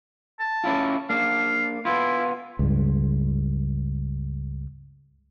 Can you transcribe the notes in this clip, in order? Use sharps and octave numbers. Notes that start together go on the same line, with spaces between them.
A5
C#4 E4 F4
A#3 D4 F5
B3 E4 F4
C#2 G2